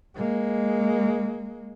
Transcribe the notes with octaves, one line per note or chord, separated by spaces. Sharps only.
G#3 A#3